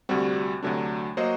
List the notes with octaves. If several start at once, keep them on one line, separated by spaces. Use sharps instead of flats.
D2 C3 G3 C4 F#4
D2 C3 F#3 A3 D4
F#3 A#3 F#4 C5 D#5